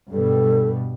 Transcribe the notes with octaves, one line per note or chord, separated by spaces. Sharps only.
G2 B2 G3 A4